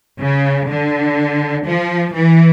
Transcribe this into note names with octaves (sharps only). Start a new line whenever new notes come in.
C#3
D3
F3
E3